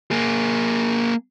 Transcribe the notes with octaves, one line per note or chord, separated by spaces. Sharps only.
A#3 G#4